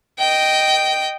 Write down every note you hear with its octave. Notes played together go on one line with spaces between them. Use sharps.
D#5 G5